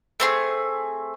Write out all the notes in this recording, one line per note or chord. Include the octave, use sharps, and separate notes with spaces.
A3 C4 G#4